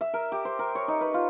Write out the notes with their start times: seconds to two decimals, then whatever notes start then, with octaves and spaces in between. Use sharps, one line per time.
0.01 E5
0.14 A#4
0.32 G4
0.45 C5
0.59 A#4
0.75 C#5
0.88 D#4
1.01 B4
1.14 F4